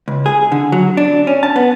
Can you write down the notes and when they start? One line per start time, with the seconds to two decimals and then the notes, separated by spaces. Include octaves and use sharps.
0.08 C#2
0.26 G#4
0.52 D3
0.72 F#3
0.97 D4
1.27 C#4
1.43 A5
1.56 B3